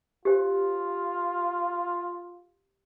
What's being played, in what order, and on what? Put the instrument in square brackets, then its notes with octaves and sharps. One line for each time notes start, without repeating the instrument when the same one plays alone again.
[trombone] F4 [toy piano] G4 C5